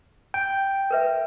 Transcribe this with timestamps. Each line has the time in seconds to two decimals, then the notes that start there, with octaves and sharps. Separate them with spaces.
0.34 G5
0.90 A#4 B4 E5